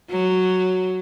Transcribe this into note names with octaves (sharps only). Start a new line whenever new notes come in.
F#3